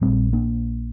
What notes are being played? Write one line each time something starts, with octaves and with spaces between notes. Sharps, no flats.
A#1 A#2 G3 C4
A#3 D4